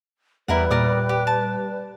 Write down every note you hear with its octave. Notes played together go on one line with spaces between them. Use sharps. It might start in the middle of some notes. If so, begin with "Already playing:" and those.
E2 G3 E4 A#4 B4 F#5
A#2 G3 A#4 D5 D#6
G4
A5